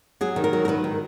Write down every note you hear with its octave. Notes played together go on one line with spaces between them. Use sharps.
F#3 G#4
D#3
A#4
F#3
A#4
D#3 B4
D#3